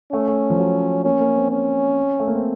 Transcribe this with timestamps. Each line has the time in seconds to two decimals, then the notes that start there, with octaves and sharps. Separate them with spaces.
0.12 A3 C#4
0.28 A3
0.50 F3
0.59 F#3
1.05 A#3 C#4
1.20 A#3
1.36 C4
1.51 C#4
2.20 A3
2.28 A#3
2.35 C4